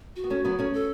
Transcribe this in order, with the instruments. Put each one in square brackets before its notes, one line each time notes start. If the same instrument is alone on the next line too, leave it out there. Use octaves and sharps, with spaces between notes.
[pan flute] F#4
[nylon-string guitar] B3
A3 C#4
F#3 B3
A3 C#4
[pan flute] A4